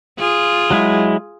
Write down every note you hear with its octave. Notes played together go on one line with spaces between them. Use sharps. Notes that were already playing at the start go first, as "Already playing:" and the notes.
F4 G#4
F#3 G#3 E4